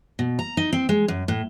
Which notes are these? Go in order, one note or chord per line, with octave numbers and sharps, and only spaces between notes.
B2
A#5
D#4
C4
G#3
F#2
A2